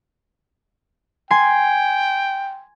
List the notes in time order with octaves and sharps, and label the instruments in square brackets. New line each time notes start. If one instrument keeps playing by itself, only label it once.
[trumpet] G5 [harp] G#5 C6 C7